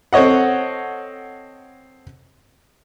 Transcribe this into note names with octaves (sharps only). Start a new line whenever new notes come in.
C4 A4 C#5 D#5 F#5